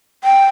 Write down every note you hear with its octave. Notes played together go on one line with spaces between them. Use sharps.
G5